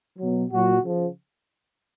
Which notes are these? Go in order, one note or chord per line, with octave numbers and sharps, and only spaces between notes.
B2 F#3
A#2 F#3 F#4
C#3 F3